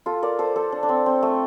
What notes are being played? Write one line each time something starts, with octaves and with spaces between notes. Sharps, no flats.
F4 A4
A#4 D5
A4 C5
A4 C5
D4
D4
C4
C4
A3